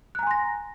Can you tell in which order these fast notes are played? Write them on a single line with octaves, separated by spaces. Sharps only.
F#6 A#5 G#5 C6 A#6